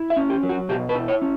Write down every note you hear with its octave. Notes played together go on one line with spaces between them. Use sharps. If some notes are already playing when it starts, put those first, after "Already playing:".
Already playing: E4
E5
C#4
G4
F#3
F#4
B2 G4
B4
E4
C#5
C#4